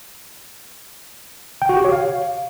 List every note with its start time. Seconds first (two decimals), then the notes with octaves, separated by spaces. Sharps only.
1.62 G5
1.69 F#4
1.77 G4
1.85 C#5
1.92 F5